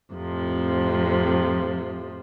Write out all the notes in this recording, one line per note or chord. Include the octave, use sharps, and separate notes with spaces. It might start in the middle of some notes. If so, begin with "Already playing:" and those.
F2 A2 C3 F3